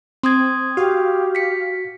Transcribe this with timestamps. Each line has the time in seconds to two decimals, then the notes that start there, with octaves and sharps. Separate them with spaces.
0.23 C4 C6 D#6 G#6
0.77 F#4 G4 F5
1.35 B6 C#7